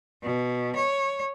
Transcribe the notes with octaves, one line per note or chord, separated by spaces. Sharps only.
B2
C#5